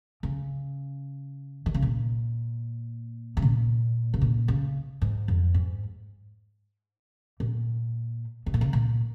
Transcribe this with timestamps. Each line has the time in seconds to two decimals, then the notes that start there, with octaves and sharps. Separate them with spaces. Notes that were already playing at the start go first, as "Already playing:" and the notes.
0.23 C#3
1.66 D#3
1.74 C#3
1.82 A#2
3.37 C#3
3.42 A#2
4.14 C#3
4.21 A#2
4.48 C#3
5.02 G#2
5.28 F2
5.54 G#2
7.40 A#2
8.46 C#3
8.54 A#2
8.61 C#3
8.73 A#2